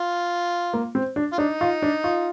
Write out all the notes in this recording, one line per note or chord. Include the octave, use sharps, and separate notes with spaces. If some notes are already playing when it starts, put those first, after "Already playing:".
Already playing: F4
A#3
C4
D4
F4
D4 D#4
F4
D4
F4